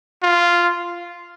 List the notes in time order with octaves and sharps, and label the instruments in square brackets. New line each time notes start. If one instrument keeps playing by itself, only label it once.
[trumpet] F4